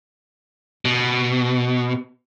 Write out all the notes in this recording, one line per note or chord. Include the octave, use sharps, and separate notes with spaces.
B2